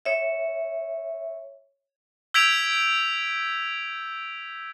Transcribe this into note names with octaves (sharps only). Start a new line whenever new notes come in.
C#5 E5
E6 G6 G#6 B6 D7 F7